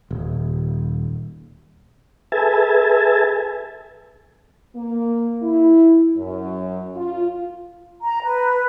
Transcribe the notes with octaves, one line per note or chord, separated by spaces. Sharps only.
D#1
G#4 A4 B4 E5 G#5 A5
A#3
E4
F#2
F4
A#5
B4